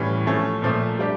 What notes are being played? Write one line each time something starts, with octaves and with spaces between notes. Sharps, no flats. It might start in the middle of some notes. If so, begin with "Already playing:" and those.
Already playing: A2 E3 G3 C#4
F3 A3 C#4
A#2 F3 A3
G3 D4 G4